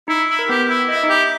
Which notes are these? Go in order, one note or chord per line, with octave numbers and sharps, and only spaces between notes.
D#4 E4
E4
A#4
B3 G4 B4
E4
E4 D#5
E5
D#4 D#5
G4